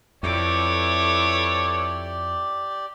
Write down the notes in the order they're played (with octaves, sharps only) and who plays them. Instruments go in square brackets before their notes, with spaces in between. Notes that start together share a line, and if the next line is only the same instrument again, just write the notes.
[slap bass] F2 [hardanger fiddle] E4 D6 [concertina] G4 D5 [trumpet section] A4 B4 C#5